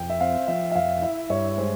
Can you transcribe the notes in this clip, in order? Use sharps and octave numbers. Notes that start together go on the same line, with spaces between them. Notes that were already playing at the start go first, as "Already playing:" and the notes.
Already playing: F2 G5
E5
C4 F5
F3 E5
E5
F2 F5
E4 E5
G2 C#5
G#3 C5